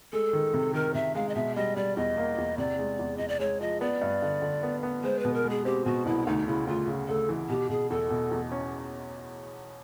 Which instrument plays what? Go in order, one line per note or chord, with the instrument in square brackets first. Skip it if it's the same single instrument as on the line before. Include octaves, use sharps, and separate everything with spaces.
[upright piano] G#3 [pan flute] A4
[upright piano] D#3
C3
[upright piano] D#3 [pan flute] A#4
[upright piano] C3 [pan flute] E5
[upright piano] G#3 [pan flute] F5
[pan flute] D#5
[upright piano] B2 [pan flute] E5
[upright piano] G3 [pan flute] D#5
[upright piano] G3 [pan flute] D5
[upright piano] E2 [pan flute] D#5
[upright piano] A#3
E2
[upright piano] C3 [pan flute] D5
[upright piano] G#3
E2
[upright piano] E2 [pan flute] D#5
[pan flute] D5
[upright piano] G#3 [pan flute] C#5
[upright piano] F3 [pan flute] D#5
[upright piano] B3 [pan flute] D5
[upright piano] G2
D3
D3
B3
B3
[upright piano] G#3 [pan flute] C5
[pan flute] B4
[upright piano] B2
[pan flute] A#4
[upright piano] G#3
[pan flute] G#4
[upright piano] C4 [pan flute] G4
[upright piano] B2 [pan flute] F#4
[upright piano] C2 [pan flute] E4
[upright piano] D2 [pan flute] D#4
[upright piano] C#3 [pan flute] E4
[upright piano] D2 [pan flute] F4
[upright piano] C#3
[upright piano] D2 [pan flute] A4
[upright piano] E3
[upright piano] B2 [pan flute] G4
[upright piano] B2 [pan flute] G#4
[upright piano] E2 [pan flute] A4
[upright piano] B2
E2
C#4